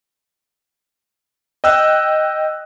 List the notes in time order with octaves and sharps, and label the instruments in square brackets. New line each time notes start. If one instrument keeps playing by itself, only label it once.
[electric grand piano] D#5 G5 E6 F#6